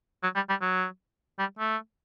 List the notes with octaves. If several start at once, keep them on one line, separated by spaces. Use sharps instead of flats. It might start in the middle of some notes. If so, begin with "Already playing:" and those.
F#3
G3
G3
F#3
G3
A3